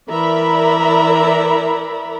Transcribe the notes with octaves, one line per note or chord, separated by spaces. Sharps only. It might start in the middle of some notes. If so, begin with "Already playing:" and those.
E3 A#4 D5 E5 A#5 B5